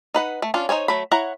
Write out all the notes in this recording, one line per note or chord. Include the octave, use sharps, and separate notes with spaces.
D#4 B4 F#5
A3
C#4 D4 F4
D#4 C5 C#5 G#5
F#3 A3 B5
E4 C#5 F#5 A#5